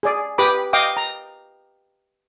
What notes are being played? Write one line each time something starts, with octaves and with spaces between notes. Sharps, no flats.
G#4 D5
G4 B4 B5 D6 D#6
D#5 F5 G5 D6 D#6
A#5